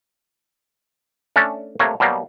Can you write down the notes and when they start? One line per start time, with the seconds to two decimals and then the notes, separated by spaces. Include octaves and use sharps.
1.36 A3 C#4 D4 A4
1.79 C3 A3 A#3 C#5
2.00 B2 F#3 G3 A#3